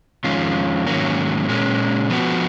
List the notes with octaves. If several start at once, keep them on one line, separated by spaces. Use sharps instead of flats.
F2 D#3 G#3 C#4 F4
G#2 D#3 F#3 A#3 C#4
A#2 G#3 C#4
F3 B3 F#4